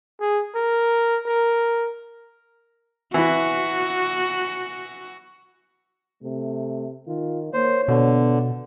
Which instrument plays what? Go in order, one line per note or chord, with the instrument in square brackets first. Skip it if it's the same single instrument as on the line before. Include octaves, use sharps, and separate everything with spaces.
[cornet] G#4
A#4
A#4
[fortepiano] E3 E4 [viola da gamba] F#4
[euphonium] C3 [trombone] A3
[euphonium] D#3 [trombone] F4
[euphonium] A#3 [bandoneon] C5 [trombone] C#5
[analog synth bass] B2 [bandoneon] D3 [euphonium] B3